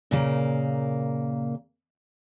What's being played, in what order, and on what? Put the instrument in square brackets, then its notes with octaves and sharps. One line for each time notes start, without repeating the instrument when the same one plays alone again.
[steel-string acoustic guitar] A#2 C#3 A#3